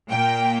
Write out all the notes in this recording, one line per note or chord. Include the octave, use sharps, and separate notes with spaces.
A#2 A#3 G5